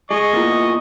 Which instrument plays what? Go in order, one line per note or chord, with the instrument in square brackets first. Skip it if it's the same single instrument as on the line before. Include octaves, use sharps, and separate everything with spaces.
[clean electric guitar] G#3 [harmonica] D#5 C#6
[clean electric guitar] E2 A#2